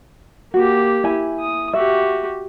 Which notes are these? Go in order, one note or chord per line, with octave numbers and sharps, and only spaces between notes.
A#3 F#4 G4
E4 G#5
D#6
F#4 G4 E5